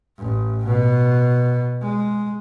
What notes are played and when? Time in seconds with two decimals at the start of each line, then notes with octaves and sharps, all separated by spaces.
0.18 A1
0.66 B2
1.80 G#3